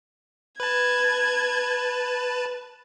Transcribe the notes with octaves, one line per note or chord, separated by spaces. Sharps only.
B4 A5 G#6